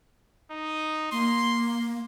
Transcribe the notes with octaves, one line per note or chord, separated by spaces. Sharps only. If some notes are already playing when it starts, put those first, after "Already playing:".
D#4
A#3 C6